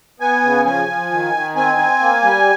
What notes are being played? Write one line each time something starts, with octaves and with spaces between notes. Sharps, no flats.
B3 G#5
C#3
F3 G#5
F3
D#3
D#3
C4 G#5
C4
A#3
G3